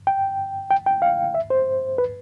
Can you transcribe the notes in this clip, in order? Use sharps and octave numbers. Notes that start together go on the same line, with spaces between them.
G5
G5
G5
F5
E5
C5
B4